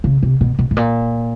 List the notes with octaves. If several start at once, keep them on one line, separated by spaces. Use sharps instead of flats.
C#3
C3
B2
B2
A2
A#2